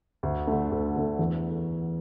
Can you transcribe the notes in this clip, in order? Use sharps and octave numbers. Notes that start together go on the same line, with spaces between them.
D2
D3 A3
D2
D3 A3
E2